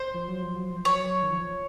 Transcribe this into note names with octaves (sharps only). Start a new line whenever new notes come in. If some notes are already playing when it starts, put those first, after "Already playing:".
Already playing: C5
F3
F#3
F3
F#3
F3
F#3 C#5
D#3
F3